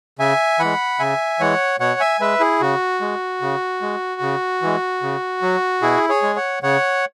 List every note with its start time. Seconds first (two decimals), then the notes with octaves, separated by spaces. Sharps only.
0.19 C#3 E5 G#5
0.60 E3 G#3 F#5 B5
0.99 C#3 E5 G#5
1.40 E3 G#3 C#5 F#5
1.80 B2 C#5 F#5
2.00 E5 G#5
2.20 G#3 B4 E5
2.40 E4 G#4
2.61 C#3 F#4
3.01 G#3
3.42 C#3
3.82 G#3
4.21 C#3
4.62 E3 G#3
5.02 C#3
5.42 F#3
5.82 B2 E4 G#4
6.09 G#4 C#5
6.23 G#3
6.36 C#5 F#5
6.63 C#3 C#5 F#5